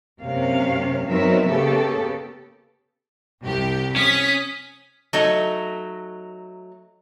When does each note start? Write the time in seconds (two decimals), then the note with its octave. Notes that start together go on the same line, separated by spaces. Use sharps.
0.22 F#2 C3 A#3 C#4 F5
1.07 F#3 B3 C4 D#4 A#4 E5
1.48 C#3 A#3 B3 G4 A4
3.43 C2 G4
3.96 C#4 D#6 B6
5.13 F#3 A3 D#4